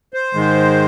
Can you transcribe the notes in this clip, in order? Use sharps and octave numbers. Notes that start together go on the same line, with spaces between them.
C5
G#2 D#3 G#3